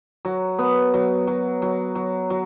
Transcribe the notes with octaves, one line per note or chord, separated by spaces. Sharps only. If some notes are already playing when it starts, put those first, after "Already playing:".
F#3
B3
F#3
F#3
F#3
F#3
F#3